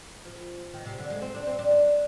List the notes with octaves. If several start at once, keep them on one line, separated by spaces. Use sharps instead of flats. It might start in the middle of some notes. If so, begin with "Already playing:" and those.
F3
D#3
C3
D3
G#3
C4
D4
C4
D4
D4